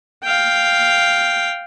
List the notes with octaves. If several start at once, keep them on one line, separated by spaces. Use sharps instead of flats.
F5 G5